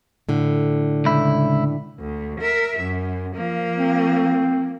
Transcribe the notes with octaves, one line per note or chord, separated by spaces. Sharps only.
A2 D3
C#2 E4
D2
A#4 E5
F#2
F3 A#3
C4